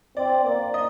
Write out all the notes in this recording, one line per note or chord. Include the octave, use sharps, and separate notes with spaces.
C4 D5
A#3 D5
D#5